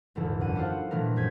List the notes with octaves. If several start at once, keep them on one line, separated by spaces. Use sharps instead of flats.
D#1 G#1 E2 D3 E3 E6
F#2 D3 F#5 D#7
B3 D4 E4 F4 C5 F#5
A#2 D#3 E3 A3 A#4
A#1 F#2 G#4 G6 G#6 B6